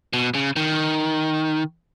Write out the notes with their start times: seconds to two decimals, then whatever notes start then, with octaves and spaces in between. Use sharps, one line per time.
0.13 B2
0.35 C#3
0.56 D#3